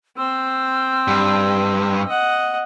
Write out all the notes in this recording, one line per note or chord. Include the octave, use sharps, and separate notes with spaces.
C4 C5 E6
G2
D#5 F#5